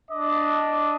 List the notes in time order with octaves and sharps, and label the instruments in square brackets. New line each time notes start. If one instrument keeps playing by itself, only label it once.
[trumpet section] D4 D#5 D6